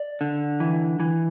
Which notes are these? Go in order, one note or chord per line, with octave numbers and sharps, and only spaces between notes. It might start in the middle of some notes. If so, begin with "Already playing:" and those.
Already playing: D5
D3
E3
E3